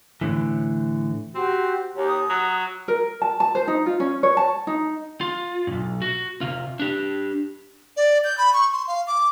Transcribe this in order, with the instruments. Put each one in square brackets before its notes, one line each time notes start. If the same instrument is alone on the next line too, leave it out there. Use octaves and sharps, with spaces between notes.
[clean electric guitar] A2 D3 E3
[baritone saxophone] C4 [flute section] F#4 G4
[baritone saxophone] D#2 [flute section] G4 C#5
[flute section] D#6
[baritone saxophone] F#3
[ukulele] A#4
A5
A5
C5
D#4
F4
C#4
C#5
A5
D#4
[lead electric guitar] F4
B1 G2
F#4
C3 F4
D4 G4
[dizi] D5
G6
B5
C#6
C6
F5
D6